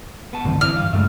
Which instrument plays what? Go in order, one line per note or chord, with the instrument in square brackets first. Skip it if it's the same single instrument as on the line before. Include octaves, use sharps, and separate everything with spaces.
[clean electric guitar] B3 A5
[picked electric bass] G#1 D3 E3 [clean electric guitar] D2 G2 C4
[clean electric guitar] C4 E4 D5 [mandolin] F6
[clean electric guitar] G2 F5
[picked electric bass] G2 G#3 [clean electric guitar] C#3 A3 E5